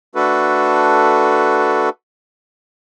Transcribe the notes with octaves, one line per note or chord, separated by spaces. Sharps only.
A3 D4 F#4 A4 B4